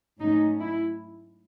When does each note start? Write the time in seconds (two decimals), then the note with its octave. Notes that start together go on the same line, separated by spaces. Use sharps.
0.19 G#2 F#3 A3 C#4 D#4
0.59 E4